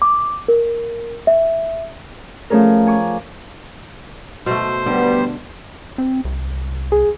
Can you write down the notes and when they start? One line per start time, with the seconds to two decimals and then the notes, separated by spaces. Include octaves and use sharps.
0.02 D6
0.48 A#4
1.27 E5
2.50 F3 A3 C#4 G#4 A#4
2.87 G#5 C#6 D6
4.46 B2 A3 C5
4.86 D3 G3 B3
5.98 C4
6.25 C2
6.92 G#4